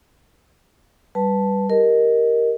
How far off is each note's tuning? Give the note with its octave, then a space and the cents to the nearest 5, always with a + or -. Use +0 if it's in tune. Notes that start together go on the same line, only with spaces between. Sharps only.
G3 +0 B4 +0 A5 +0
G4 +0 A#4 +0 D#5 +0